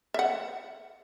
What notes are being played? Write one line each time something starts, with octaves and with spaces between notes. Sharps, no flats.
E5 F#5